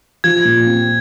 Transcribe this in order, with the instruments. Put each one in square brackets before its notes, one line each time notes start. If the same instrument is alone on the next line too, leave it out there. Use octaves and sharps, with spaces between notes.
[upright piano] F3 [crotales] G#6
[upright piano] A#2
C4